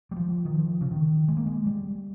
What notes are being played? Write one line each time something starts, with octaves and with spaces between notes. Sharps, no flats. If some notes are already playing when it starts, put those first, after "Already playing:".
G3
F3
D#3
F3
C#3
D#3
G#3
A#3
G#3
G3